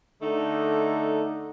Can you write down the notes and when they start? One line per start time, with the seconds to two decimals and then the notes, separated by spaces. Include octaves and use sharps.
0.22 D3 A3 D#4